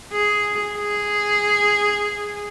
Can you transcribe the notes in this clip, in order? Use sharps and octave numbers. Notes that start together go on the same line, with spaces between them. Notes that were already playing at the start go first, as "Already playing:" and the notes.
G#4
G#4